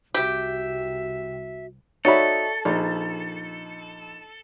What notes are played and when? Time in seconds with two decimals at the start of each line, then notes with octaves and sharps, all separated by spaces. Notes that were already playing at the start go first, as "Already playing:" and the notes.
0.14 C2 C3 F#4 G4 E5
2.05 D#4 F#4 A4 C#5 D5 E5 B5
2.65 A#1 D#4